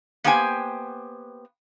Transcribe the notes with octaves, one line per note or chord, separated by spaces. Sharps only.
A#3 B3 G4 C5 G5 G#5